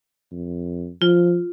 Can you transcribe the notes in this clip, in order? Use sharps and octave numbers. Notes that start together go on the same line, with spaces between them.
F2
F3 F4